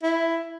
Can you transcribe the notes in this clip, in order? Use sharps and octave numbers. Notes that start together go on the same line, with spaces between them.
E4